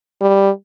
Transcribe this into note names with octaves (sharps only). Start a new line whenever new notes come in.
G3